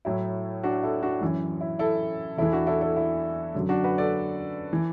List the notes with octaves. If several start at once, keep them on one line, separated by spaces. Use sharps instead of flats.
A2 F#3 E4
D4 F#4
E4 A4
D4 F#4
F#2 E3
E4
E4 A4
E2 E3 E4 A4
D4 F#4
E4 A4
E4 A4
E4
F#2 D3 F#3
D4 F#4
F#4 B4
A4 D5
E3